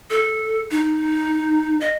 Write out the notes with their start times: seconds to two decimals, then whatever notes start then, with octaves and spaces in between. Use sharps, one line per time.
0.11 A4
0.71 D#4
1.81 D#5